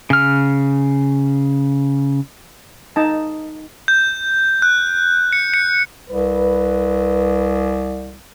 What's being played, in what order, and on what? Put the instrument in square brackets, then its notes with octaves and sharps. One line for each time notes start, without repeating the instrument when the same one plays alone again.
[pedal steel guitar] C#3 F6
[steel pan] D#4 A5
[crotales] G6
F#6
C#7
C#7
[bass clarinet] C2 [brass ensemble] B4